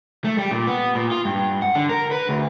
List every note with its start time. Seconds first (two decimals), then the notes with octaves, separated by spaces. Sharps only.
0.24 A3
0.38 G3
0.51 A#2
0.67 B3
0.95 A#2
1.11 F4
1.25 G2
1.62 F#5
1.75 D3
1.89 A#4
2.11 B4
2.29 D2